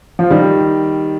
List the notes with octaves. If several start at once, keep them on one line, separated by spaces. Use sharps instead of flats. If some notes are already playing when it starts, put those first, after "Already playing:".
F3
D#3 G3